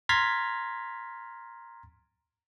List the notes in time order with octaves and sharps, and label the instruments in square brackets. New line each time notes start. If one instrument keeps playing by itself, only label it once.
[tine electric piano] A#5 C6 F6 G#6 A6 B6